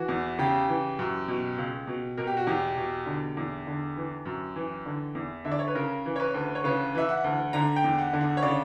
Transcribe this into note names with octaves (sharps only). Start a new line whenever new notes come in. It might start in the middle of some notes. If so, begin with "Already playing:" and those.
Already playing: E3 F#4
E2
C#3 G4
E3
F#2
B2
C#2
B2
B2 A#4
G4
F#4
E2 G4
B2
D3
E2
D3
E3
F#2
E3
D3
E2
D3 E5
D5
C#5
B4
C#3 A#4
E3
C#5
B4
D2
C#5
C#3 B4
E3 E5
F#5
D2
D3 A#5
G5
E2
F#5
D3
F#5
C#5
C#3 D5